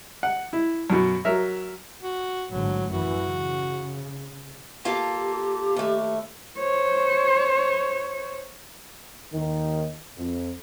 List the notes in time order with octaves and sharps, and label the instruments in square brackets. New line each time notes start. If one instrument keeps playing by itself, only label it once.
[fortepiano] F#5
E4
F#2 B2
F#3 A#4 E5
[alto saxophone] F#4
[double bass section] A1 G#2 D3 [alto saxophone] F#3
[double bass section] F#2 E3 [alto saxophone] F#4
[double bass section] C#3
[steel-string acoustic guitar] A#3 F4 A4 [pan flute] G4
[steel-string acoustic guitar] D#2 A3
[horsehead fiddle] C5 C#5
[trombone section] D#2 D#3
F2